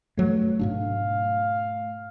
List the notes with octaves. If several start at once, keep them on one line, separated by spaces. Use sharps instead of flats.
G2 F#3 A3
G#2 B2 D4 F5